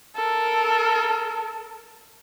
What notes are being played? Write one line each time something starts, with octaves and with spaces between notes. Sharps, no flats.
A4 A#4